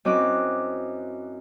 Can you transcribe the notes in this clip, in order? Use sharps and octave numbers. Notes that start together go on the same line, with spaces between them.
F#2 C4 E4 D#5 D6 F#6